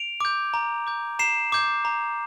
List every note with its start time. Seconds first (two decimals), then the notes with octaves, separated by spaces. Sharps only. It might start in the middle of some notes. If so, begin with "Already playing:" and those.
Already playing: D7 F7
0.21 D6 G6
0.54 A#5
0.87 D6 G6
1.19 A#5 C7 E7
1.52 D6 G6
1.85 A#5